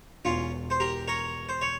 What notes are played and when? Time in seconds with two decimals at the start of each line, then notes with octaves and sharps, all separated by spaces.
0.25 E1 E2 E3 C#4 F4
0.70 C5
0.80 G4 A#4
1.08 A#4 C#5
1.49 C5
1.61 C#5